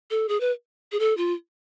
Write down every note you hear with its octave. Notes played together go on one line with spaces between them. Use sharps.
A4
G#4
B4
G#4
A4
F4